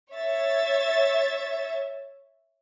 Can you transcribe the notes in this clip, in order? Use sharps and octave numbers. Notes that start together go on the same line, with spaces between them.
C#5 E5 A6